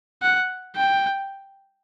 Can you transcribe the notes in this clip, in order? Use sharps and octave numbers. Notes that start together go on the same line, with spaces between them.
F#5
G5